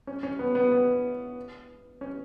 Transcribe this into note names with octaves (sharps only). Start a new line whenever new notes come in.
C#4
C#4
B3
B3
B3
C#4